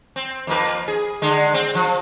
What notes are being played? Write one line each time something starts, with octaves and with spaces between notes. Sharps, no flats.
C4
F2 A#3 B4
G#4
D3 G#3
C4
F3